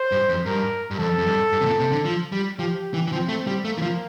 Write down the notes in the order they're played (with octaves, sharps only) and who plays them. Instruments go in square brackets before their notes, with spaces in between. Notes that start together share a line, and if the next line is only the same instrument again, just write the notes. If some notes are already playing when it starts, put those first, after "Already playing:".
Already playing: [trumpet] C5
[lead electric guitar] G2
F2
[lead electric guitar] G2 [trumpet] A#4
[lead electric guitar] G2
[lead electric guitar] F2 [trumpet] A4
[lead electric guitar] F2
G2
G2
C3
A#2
C3
D3
F3
G3
[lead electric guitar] F3 [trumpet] G4
[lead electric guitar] E3
E3
[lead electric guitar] F3 [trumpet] C4
[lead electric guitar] A3
G3
[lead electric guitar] A3 [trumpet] A#3
[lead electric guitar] E3
F3